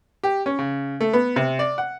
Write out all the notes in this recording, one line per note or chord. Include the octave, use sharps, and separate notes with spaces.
G4
C#4
C#3
A3
B3
C3
D5
F#5